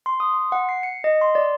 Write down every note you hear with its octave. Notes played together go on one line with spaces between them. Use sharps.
C6
D#6
C6
F#5
C7
C#7
D#5
C6
D5